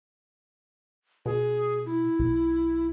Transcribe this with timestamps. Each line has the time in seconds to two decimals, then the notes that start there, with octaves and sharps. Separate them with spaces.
1.26 B2 G#4
1.86 E4
2.19 B1